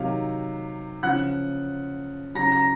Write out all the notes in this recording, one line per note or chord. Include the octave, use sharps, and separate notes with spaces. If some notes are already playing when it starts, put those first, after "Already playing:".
Already playing: C3 D#3 F#3 F5
C#3 F3 F#5 F#6
C#3 F#3 A#5 A#6
A#5 A#6